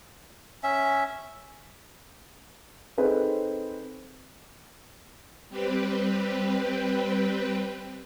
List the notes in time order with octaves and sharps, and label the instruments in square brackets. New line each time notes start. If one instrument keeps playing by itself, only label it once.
[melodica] C#4 E5
[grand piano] C4 D#4 G#4 A4 B4 C5
[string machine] G3 C4 G4 B4